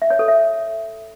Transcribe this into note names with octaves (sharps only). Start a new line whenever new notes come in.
E5
C#5
A4
E5